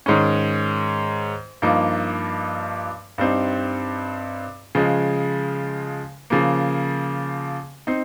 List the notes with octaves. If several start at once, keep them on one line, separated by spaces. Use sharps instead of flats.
G#2 D#3 G#3 C#4
G2 F3 A#3 D#4
G2 G3 C4 D#4
C#3 F3 G#3
C#3 F3 A#3
C4 D#4